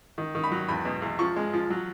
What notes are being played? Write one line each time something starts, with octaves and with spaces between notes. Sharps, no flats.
D#3
D#3
B5
F#3
E2 B5
B2
E2
F3 C#6
G#3
F3
F#3